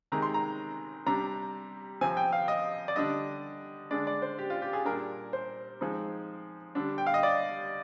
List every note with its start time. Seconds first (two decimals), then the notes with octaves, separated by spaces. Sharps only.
0.12 C3 D#3 G#3 A#5
0.22 C6
0.34 A#5
1.06 C3 G3 D4 A#5
2.01 C3 F3 C4 G#5
2.17 G5
2.32 F5
2.48 D#5
2.88 D5
2.96 D3 G3 D4 D#5
3.91 D3 G#3 D4 D5
4.07 D5
4.22 C5
4.39 G4
4.50 F4
4.62 G4
4.73 G#4
4.85 A#2 G3 D4 A#4
5.33 C5
5.81 F3 G#3 C4 D#4
6.75 D3 G3 D4
6.98 G5
7.06 F5
7.14 D#5
7.23 D5